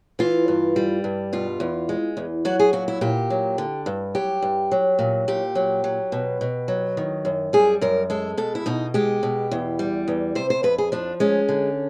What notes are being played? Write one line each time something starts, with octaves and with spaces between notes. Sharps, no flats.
E3 F4
G2
G3
G2
B2 F4
E2
G#3
E2
F#3 F#4
G#4
A#2 F#4
E4
A#2 G4
F#3
D3
G2
F#3 G4
G2
F#3
A#2
A#2 G4
F#3
F#3
B2
B2
F#3
D#3
F#2
G3 G#4
F#2 A#4
G#3 A4
B2 A4
E4
B2 D#4
G#3 G4
B2
E2
G3
E2
C3 C5
C5
F2 B4
G#4
F3 D4
G#3 C#4
D3